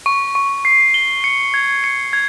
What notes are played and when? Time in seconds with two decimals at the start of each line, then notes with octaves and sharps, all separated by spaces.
0.06 C#6
0.35 C#6
0.65 C7
0.94 G7
1.24 C#7
1.54 G#6
1.84 C#7
2.13 G#6